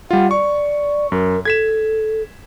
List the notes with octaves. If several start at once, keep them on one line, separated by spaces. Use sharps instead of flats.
G3 F4 F#5
D5 C#6
F#2 A#4
A4 G#6 B6 E7